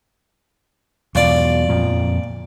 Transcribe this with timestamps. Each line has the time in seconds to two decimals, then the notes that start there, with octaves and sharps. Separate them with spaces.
1.15 E2 B2 F#3 F4 D5
1.69 F2 A#2 F3